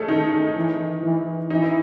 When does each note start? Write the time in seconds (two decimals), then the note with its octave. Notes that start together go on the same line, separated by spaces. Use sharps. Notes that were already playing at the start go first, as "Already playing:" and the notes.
Already playing: A3 C#4 G#4 A4 D#5
0.08 D#3 D#4
0.56 E3
1.03 E3
1.50 E3 D#4
1.62 E4